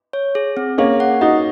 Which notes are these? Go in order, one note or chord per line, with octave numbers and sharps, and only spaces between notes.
C#5
G#4
C4
A#3 C#4 G#4
F#5
D#4 F#4 D#5